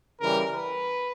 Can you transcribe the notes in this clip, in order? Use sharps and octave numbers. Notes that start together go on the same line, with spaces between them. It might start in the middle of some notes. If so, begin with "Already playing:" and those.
C#3 E3 G3 A#4
B4